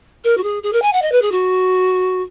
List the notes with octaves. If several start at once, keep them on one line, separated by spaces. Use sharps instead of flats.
A#4
F#4
G#4
G#4
A#4
G#5
F#5
D#5
B4
G#4
F#4